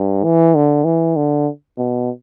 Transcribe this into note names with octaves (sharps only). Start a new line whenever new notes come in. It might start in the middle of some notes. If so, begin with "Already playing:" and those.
Already playing: G2
E3
D3
E3
D3
B2